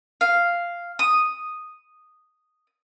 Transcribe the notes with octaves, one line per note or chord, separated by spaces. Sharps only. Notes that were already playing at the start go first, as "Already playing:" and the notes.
F5
D#6